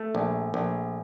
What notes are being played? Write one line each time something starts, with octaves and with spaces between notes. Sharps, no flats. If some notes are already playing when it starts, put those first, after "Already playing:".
Already playing: A3
A#1
A#1